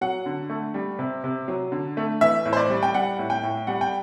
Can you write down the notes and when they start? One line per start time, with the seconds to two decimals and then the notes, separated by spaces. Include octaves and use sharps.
0.01 F#3 F#5
0.26 D3
0.50 A3
0.74 G3
0.99 C3
1.24 C3
1.48 F#3
1.72 D3
1.97 A3
2.21 E3 E5
2.45 A2
2.53 C5
2.57 D5
2.70 G3
2.83 G5
2.94 G3 F#5
3.19 A2
3.30 G5
3.43 A2
3.67 G3 F#5
3.81 G5